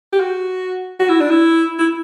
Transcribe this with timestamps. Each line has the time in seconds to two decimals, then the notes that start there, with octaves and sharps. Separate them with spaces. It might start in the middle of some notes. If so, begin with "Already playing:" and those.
0.13 G4
0.20 F#4
1.00 F#4
1.09 E4
1.20 D4
1.30 E4
1.79 E4